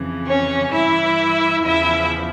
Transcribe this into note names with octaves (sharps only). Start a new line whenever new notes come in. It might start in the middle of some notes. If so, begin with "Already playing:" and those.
Already playing: F2 C#3 E3
C#4 C#5
G2 E3 E4 E5
E2 C#3 F3 E4 E5